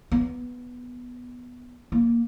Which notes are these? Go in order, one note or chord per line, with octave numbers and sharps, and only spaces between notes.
B3
A#3